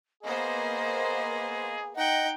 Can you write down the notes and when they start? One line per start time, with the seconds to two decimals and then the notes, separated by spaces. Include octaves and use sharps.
0.23 A#3 B3 G#4 C5 D#5
1.96 D#4 D#5 F#5 G5